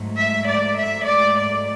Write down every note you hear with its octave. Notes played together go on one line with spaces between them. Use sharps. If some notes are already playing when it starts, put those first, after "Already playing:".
Already playing: G#2 F#3 A3
E5
D5
E5
D5
D5